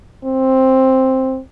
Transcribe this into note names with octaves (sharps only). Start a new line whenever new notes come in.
C4